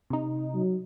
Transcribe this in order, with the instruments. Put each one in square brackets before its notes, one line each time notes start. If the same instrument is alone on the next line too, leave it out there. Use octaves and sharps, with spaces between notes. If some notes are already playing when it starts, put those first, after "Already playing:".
[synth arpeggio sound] C3 D#4
[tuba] F#3